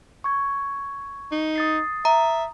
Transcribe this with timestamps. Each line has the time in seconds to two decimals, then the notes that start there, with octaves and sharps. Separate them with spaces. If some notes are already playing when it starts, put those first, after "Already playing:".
0.24 C#6 G#6
1.32 D#4
1.56 D#6 A6 C7
2.05 E5 A#5